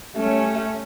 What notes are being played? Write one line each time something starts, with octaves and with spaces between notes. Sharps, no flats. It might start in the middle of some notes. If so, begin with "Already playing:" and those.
G3 A3 C#4